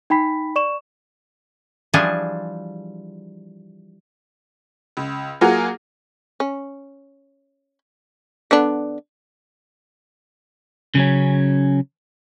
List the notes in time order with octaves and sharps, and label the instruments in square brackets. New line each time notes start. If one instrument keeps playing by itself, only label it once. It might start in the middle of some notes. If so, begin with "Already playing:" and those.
[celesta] D#4 G5 B5 B6
D5 C#6 E7
[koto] E3 F3 G3 D4 G#4
[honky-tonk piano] C#2
F#3 A#3 F4 G#4 A#4 F#5
[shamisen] C#4
D3 B3 D4
[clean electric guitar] C#3 F#3 C#4